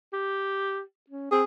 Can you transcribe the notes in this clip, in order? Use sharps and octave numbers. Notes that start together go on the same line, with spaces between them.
G4
C#4
C4 G#4